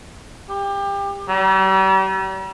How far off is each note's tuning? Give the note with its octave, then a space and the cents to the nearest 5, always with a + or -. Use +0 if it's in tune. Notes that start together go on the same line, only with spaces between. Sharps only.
G4 +30
G3 -40